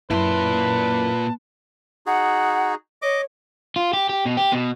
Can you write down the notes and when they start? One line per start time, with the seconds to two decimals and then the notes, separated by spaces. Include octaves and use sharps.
0.11 F#2 A#2 E4 B4 A5 C6
2.06 D#4 F#4 G#4 F#5
3.02 C#5 D#5 D6
3.76 F4
3.93 G4
4.09 G4
4.25 B2
4.37 G4
4.52 B2